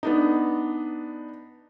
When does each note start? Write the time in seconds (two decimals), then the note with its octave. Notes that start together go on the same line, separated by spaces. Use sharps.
0.03 B3 D4 D#4